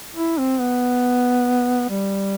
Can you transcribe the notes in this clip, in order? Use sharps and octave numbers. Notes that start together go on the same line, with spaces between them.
E4
C4
B3
G3